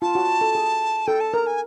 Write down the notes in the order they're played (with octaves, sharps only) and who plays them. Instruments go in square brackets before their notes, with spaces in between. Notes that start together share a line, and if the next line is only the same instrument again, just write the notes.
[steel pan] F4 [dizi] A5
[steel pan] F#4
A4
G#4
[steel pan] A4 [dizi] G5
[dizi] A5
[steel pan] A#4 [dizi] A#5
[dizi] G#5